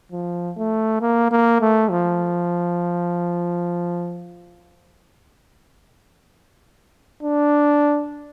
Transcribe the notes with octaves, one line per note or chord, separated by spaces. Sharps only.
F3
A3
A#3
A#3
A3
F3
D4